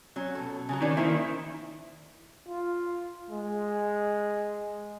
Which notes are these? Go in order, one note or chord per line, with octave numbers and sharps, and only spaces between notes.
F#3 C#4
B2 A4
C#3 F#3 F#4
D#3 C#4 D5
D#3 A#3 D#4 E4 C5
F4
G#3